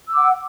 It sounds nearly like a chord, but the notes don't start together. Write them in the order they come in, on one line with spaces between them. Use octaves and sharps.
E6 D6 F#5